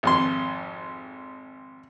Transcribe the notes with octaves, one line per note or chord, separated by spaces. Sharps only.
G#1 F2 C6